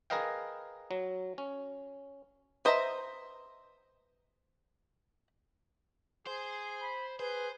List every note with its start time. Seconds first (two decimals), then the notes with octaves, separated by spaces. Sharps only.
0.10 G#4 A#4 B4 D#5 F5 G5
0.91 F#3
1.38 C#4
2.65 B4 C5 D#5 E5 A#5
6.27 G#4 C5
6.81 B5
7.19 G#4 B4 C5